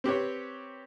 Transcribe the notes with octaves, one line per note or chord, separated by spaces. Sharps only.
C4 G4 B4 C#5